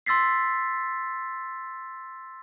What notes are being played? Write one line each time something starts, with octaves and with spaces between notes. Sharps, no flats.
C6 E6 A6 B6 C7